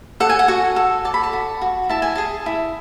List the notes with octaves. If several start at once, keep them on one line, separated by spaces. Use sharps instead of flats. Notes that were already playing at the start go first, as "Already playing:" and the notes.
A4 F#5
G#5
F#5
F#4
A4
D5 A5
B5
A5
F#4
F#4
E4 A5
G#5
G#4 A5
E4